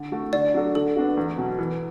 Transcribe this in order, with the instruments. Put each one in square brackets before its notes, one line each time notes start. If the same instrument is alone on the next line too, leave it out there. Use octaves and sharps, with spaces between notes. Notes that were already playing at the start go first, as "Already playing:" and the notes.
Already playing: [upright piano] D3
A3 F#4 A4
[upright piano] D3 [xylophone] D5
[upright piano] F#3 D4 F#4 A4
[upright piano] D3 [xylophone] A4
[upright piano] B3 D4 F#4
E2
B2 F#3
E3